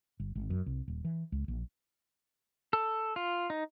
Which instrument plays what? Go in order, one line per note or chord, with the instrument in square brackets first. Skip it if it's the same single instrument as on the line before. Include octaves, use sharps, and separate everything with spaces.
[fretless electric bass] G1
G#1
F#2
C2
D#1
E3
C#2
A#1
[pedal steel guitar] A4
F4
D#4